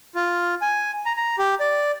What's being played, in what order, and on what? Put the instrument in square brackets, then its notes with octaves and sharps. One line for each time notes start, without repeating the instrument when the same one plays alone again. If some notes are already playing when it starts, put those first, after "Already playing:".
[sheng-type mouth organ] F4
G#5
A#5
A#5
G4
D5